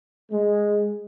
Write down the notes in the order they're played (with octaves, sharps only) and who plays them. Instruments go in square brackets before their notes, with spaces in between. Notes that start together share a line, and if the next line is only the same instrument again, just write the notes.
[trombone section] G#3